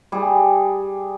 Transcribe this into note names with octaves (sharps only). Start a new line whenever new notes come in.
G3 G#4